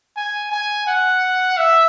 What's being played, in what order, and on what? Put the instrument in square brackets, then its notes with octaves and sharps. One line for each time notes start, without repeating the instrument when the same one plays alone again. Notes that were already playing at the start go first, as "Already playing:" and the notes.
[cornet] G#5
G#5
F#5
E5